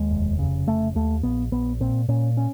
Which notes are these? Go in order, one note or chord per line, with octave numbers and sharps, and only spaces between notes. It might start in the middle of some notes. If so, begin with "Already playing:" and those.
Already playing: D#2 G#3
F1
C#3
F1 A3
D#2 A3
A#1 B3
A#1 B3
A#2 C4
A#2 C#4
C#4